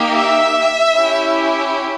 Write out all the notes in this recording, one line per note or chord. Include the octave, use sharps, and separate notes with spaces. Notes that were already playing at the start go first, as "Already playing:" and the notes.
Already playing: A#3 D#4 G4
E5
C#4 E4 G4